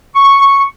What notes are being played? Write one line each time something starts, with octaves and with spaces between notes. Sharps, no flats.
C#6